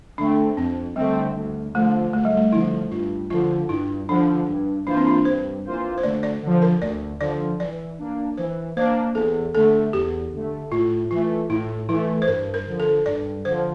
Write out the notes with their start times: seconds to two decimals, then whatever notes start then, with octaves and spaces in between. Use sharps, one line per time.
0.18 D3 A3 C4 D4
0.57 F2 C4
0.96 D3 G3 A3 C4
1.35 D2
1.75 D3 F3 A3
2.13 D2 A3
2.25 G3
2.37 A3
2.52 D3 F3 E4
2.91 G2 F4
3.30 D3 F3 F4
3.69 G2 E4
4.09 D3 F3 D4
4.48 G2
4.86 E3 A#3 D4 F4 C5
4.97 C4
5.07 D4
5.25 G2 C5
5.65 E3 A#3 F4 C5
5.98 C5
6.03 D2 D5
6.23 D5
6.42 D3 F3
6.62 A#4
6.82 D2 D5
7.20 D3 F3 D5
7.60 E3 D5
7.99 A#3 D4
8.38 E3 C5
8.76 A#3 D4 C5
9.15 E2 A4
9.55 D3 A3 A4
9.93 E2 G4
10.33 D3 A3
10.71 A2 F4
11.11 E3 A3 F4
11.49 A2 E4
11.88 E3 A3 E4
12.22 C5
12.28 G2 A#4
12.54 A#4
12.66 D3 F3
12.80 A4
13.06 G2 D5
13.45 D3 F3 C5